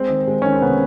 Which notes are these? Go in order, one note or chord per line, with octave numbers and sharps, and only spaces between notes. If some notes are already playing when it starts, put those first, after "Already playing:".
Already playing: G#3 C4
D#3
G#3
D#3 C#4
C4
C3 B3